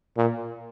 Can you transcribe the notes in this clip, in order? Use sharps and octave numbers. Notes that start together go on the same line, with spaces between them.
A#2